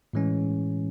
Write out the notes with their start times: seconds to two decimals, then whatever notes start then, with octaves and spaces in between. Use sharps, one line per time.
0.13 A2 E3 G#3 C#4